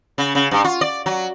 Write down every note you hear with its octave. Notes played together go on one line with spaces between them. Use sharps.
C#3
C#3
G2
F4
D5
F#3